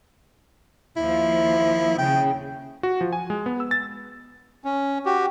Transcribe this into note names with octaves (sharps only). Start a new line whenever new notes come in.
D#2 F3 E4
C#3 G5
F#4
F3
G#5
G#3
B3
E6
A6
C#4
F#4 G4